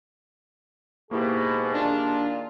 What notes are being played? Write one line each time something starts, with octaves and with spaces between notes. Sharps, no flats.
G#2 B2 A#3 E4 G4 G#4
A#2 D#3 D4 F4